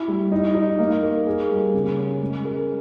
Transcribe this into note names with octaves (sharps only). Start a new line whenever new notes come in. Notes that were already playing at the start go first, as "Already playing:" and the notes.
Already playing: E4
G3
D#4
D#4
A#3
A#4
G#4
G3
C#3
C#4
G#3
A#4